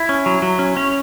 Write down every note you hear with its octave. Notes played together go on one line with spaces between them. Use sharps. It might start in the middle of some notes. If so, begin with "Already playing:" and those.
Already playing: E4
C#4
F#3
F#3
C#4
C#4